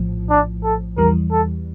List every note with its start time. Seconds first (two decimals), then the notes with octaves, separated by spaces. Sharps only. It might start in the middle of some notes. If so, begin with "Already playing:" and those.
Already playing: A#1 A2 F3
0.30 D4
0.64 A4
0.97 E2 E3 G3 A#4
1.32 A4